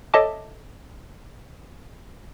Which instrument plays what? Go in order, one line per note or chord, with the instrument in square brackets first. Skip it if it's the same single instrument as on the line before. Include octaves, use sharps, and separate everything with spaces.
[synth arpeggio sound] A4 C#5 D#5 E5 A5 D6